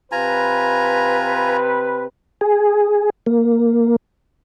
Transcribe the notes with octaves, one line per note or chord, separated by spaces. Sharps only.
C3 F4 B4 G#5 A#5
G#4
A#3